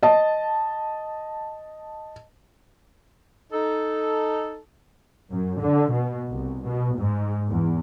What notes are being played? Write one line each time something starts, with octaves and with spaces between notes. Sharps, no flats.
D#5 A5
D#4 A4
F#2
D3
B2
C2
B2
G#2
E2